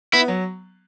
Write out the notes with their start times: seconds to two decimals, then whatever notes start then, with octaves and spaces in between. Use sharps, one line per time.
0.13 B3 E4
0.28 F#3